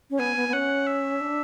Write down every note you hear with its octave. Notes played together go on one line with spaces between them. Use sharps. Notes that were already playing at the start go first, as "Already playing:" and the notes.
C#4
B3 G#5
B3
B3
C#4 F#5
E5
D4